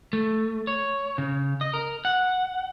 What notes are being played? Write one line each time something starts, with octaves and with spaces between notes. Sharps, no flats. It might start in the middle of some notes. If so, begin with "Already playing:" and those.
A3
C#5
C#3
D#5
A#4
F#5